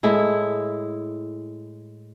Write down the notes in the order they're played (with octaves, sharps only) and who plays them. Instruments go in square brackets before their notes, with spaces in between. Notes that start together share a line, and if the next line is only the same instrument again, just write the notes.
[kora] A2 G#3 E4